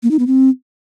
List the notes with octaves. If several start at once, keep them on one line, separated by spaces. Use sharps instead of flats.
A#3
D#4
B3
C4